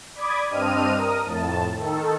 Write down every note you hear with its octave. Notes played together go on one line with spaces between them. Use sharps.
D5 B5 D6 D#6 G#6
G2 C4 D4 D#5 F6 D#7
A#4 D#6
F2 A2 A5
D#3 A4